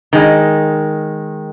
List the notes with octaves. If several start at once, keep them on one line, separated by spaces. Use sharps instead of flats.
D#3 G#3